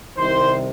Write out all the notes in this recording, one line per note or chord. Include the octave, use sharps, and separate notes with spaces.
C2 C3 D#3 C5